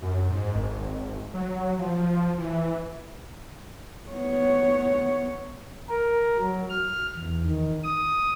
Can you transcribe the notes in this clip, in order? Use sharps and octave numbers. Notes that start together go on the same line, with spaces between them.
F#2
G#2
G#1
F#3
F3
E3
B3 C#5
A#4
F#3
F6
E2
D#3
D#6